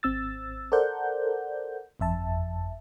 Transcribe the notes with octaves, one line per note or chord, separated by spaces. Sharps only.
G#1 C4 E6 A6
A4 A#4 C5 D5 F#5 G6
G1 F2 E5 A5